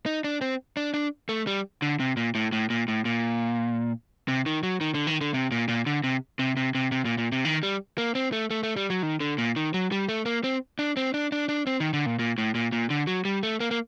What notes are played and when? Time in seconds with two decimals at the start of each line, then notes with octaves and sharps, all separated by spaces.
0.06 D#4
0.24 D4
0.41 C4
0.77 D4
0.94 D4
1.29 A3
1.47 G3
1.82 D3
2.00 C3
2.17 A#2
2.35 A2
2.52 A2
2.70 A#2
2.88 A2
3.05 A#2
4.28 C3
4.46 D#3
4.63 F#3
4.81 D#3
4.94 D3
5.07 D#3
5.21 D3
5.34 C3
5.52 A#2
5.68 A#2
5.86 D3
6.04 C3
6.39 C3
6.57 C3
6.75 C3
6.92 C3
7.05 A#2
7.18 A#2
7.32 C3
7.45 D#3
7.63 G3
7.98 A#3
8.15 C4
8.32 A3
8.51 A3
8.63 A3
8.77 G3
8.90 F#3
9.03 D#3
9.20 D3
9.38 A#2
9.56 D#3
9.74 F#3
9.92 G3
10.09 A3
10.26 A#3
10.44 C4
10.79 D4
10.97 C4
11.14 D4
11.32 D4
11.49 D4
11.67 C4
11.80 D#3
11.93 D3
12.06 A#2
12.19 A#2
12.38 A2
12.55 A#2
12.72 A#2
12.90 D3
13.07 F#3
13.25 G3
13.43 A3
13.60 A#3
13.71 A#3